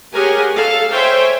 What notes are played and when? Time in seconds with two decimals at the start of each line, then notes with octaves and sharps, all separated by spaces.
0.12 G4 G#4 A#4 C#5 F#5 G#5
0.55 A4 F5
0.92 C5 C#5 E5 G5 G#5